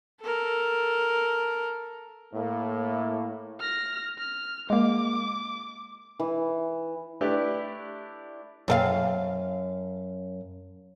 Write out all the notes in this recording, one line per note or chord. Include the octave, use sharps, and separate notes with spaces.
A4 A#4
A2 A#3
F6 A#6
F6
G#3 A#3 D6
E3
A3 D4 E4 G4 B4 D5
F#2 A4 F5